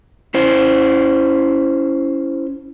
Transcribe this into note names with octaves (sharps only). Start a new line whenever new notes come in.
C#4 E4 C5